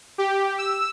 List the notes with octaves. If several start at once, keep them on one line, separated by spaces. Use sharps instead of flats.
G4
E6